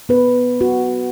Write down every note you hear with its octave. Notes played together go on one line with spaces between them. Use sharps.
B3 B4
F#4